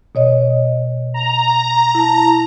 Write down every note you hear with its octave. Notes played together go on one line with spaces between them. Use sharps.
B2 C#5 D#5
A#5
E4 A5